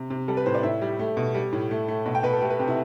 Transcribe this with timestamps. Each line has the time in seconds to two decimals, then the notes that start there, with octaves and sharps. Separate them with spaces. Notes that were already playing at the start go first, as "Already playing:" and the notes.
Already playing: C3
0.10 C3
0.28 G3 A4
0.37 B4
0.46 A2 C5
0.55 D5
0.63 A2 E5
0.81 G3
0.99 A3
1.17 B2
1.34 G3
1.53 A2
1.71 A3
1.88 A3
2.06 B2
2.15 G5
2.23 B2 B4
2.33 A4
2.41 A3 G4
2.50 B4
2.59 C3 G4
2.68 E4